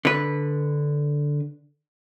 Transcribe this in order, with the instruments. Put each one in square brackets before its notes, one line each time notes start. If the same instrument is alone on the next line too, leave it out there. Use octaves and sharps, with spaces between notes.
[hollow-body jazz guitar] D3 B4